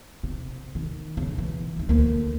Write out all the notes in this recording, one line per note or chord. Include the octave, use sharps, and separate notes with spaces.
C3
D#3
E1 C#3
E3
C#2 D#3
D2 A#3